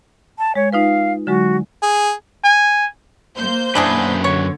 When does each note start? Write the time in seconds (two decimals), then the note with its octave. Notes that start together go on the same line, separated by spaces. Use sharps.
0.39 A5
0.55 G#3 C#5
0.73 D#4 F4 B4 F5
1.27 D3 F#3 G#3 F#4
1.83 G#4
2.44 G#5
3.36 A#3 C5 G6
3.75 F#2 D4 E4 G#4 B4
4.24 D3 C#5